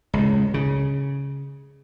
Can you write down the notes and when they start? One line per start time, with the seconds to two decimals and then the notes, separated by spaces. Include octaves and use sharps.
0.13 C#2 A2
0.54 C#3